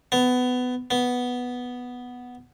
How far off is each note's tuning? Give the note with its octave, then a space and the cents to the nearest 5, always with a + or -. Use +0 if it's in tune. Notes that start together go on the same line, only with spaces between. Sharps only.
B3 +20
B3 +0